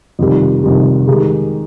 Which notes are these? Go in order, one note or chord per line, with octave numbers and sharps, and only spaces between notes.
F2 C3 D#3 G3
F2 C3 D#3 G3
D#3 G#3 D#4 G4